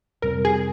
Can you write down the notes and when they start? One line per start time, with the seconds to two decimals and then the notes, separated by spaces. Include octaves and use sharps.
0.22 F2 C3 G3 C4 A#4
0.45 G#4